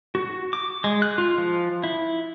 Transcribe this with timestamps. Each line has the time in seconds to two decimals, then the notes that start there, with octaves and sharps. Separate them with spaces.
0.15 F#4
0.53 D6
0.84 G#3
1.02 F#6
1.18 F4
1.38 F3
1.84 E4